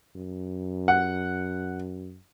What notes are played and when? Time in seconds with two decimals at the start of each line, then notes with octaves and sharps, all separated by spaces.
0.16 F#2
0.88 F#5